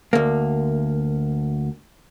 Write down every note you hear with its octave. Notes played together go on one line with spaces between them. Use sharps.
D2 A#3